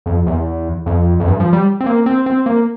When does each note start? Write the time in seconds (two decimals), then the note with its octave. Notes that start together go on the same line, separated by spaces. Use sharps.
0.06 F2
0.26 E2
0.86 F2
1.20 F2
1.27 G2
1.40 F3
1.53 G3
1.80 C4
1.86 A#3
2.06 C4
2.26 C4
2.46 A#3